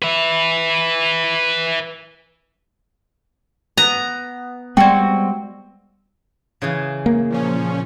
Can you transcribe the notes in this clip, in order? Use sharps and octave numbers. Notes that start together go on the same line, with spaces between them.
B4 E5
B3 A#5
G3 G#3 B3 C4 F#4 D5 G5
C#3 E3 G#4
A#3
A#2 F3 C#4